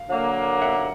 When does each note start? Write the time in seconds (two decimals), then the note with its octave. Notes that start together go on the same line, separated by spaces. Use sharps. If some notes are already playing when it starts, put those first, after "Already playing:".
Already playing: F5
0.09 D3 F#3 A#3
0.62 E5 F#5